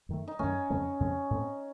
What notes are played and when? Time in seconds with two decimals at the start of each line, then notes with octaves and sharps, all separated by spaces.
0.09 F#2 D#3 A3
0.27 D#4
0.39 F#2 D#3 A3 C#4
0.70 F2 C#3 A3 C4
1.00 F2 C#3 A3 C4
1.30 A2 A3 C4